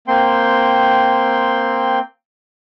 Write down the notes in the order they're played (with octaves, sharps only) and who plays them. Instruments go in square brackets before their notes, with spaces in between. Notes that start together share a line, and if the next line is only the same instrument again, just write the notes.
[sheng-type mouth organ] A#3 C4 G5 C6